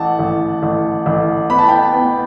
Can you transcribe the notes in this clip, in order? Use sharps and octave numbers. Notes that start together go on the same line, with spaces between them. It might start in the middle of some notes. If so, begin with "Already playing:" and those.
Already playing: A1 F#5 A5
A1
A1
A1
B3 B5
A5
G5 B5
B3